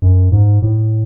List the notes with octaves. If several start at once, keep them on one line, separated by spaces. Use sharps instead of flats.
F#2
G#2
A2